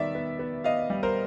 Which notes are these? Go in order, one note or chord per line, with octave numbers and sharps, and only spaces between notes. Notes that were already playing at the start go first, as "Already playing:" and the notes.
Already playing: D#3 G3 B3 D5 E5
B3
B3
B3 D#5 F5
G3
A#4 C5